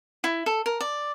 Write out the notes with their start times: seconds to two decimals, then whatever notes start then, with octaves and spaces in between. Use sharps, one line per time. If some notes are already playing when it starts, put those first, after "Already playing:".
0.24 E4
0.46 A4
0.66 A#4
0.81 D5